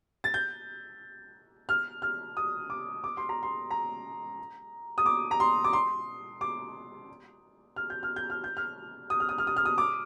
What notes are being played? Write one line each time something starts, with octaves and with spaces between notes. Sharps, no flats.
A6
G6
F6
F6
D#6
D6
D6
C6
A#5
C6
A#5
D#6
D6
A#5
C6
D6
C6
D6
F6
G6
F6
G6
F6
G6
F6
D#6
F6
D#6
F6
D#6
F6
D#6
D6